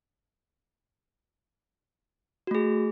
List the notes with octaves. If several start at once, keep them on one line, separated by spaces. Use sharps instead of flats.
A3 F#4 G#4